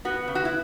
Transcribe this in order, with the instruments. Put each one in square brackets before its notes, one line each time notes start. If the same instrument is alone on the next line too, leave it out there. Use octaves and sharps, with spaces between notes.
[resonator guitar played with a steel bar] B3 F#4
C#3
F#4
E4